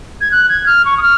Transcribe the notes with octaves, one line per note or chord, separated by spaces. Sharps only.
G#6
F#6
G#6
F6
C#6
D#6
F6